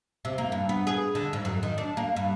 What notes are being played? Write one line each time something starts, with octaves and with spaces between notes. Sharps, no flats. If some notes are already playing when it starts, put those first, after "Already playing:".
C3
A#3
G2
B3
G#4
D3
G#2
F#2
D#3
D4
A#3
G2